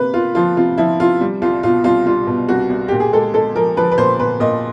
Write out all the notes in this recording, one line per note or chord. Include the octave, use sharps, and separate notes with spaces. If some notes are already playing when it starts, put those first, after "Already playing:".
Already playing: C3 A#3 B4
A#3 F4
F3 F4
C3 F4
F3 E4
C3 F4
G3
C2 F4
B2 F4
C2 F4
G3 F4
B2
C2 F#4
C2
A#2 G4
G#4
G#3 A4
G#3 A4
F3 A#4
F3 B4
B4
A#2 C5
A#2 B4
A#2 D#5